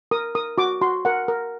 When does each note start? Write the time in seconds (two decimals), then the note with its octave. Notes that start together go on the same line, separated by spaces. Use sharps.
0.11 A#4 D#6
0.35 A#4 D#6
0.58 F#4 D6
0.81 F#4 C6
1.05 A#4 F#5
1.28 A#4